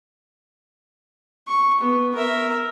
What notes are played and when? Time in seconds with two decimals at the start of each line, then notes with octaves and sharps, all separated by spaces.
1.47 C#6
1.80 B3
2.15 A#4 E5